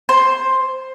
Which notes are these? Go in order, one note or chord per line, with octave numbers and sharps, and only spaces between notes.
C5